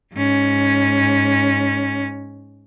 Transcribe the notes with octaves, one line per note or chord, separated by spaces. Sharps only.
G#2 C#4